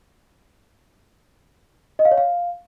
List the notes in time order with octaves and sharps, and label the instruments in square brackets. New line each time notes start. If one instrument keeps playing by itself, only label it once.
[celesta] D#5
F5
C#5
F5